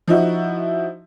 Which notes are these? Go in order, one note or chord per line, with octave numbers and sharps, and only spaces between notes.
F3 D#4 E4 F#4